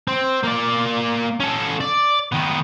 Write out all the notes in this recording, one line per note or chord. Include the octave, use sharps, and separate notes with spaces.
C4
A#3 D5
C#4 A4
D5
D#3 B3